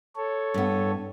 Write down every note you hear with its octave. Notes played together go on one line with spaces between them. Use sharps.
A4 C#5
G2 B3